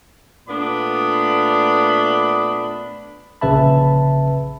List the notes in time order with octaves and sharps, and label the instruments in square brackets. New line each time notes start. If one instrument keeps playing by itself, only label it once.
[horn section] A#2 A3 B3 D4 D5 B5
[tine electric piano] A#1 C#3 B4 E5 A5 B5